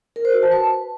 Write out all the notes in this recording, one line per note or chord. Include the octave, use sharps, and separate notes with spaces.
A#4
C5
F#4
A5
B4